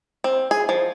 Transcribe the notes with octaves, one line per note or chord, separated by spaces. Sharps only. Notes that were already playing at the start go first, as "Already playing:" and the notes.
C4
G#4
F3